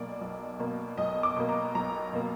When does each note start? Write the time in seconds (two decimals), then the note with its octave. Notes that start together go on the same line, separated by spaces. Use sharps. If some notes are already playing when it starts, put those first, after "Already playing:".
Already playing: B1 B2 A#3 D5
0.21 B1
0.59 B2 A#3
0.97 B1 D#5
1.23 D6
1.36 B2 A#3
1.49 A#5
1.75 B1 A#5
2.13 B2 A#3